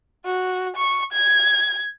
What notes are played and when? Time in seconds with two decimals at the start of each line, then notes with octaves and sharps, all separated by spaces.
0.25 F#4
0.76 C#6
1.13 G#6